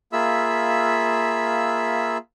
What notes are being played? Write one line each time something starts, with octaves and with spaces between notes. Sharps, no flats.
A#3 F4 G#4 E5 B5 E6